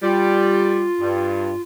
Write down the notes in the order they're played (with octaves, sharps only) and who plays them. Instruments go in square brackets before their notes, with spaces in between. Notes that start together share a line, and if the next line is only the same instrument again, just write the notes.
[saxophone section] G3 [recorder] F4
[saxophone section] G2